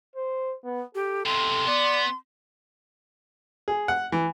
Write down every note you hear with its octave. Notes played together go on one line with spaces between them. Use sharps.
C5
B3
G4 A4
B1 C3 C6
B3 D5
G#4
F#5
E3